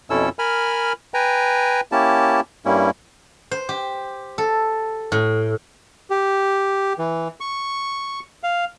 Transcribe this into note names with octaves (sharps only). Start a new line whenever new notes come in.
F2 B2 C#4 E4 A4 E6
A#4 G#5 B5 F6
B4 G5 G#5 A#5
A#3 C#4 E4 G4 A5
G2 G3 A#3 C#4 E4
C5
G4
A4
A2
G4
E3
C#6
F5